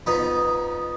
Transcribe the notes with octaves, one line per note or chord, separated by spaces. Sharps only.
F2 B3 D#4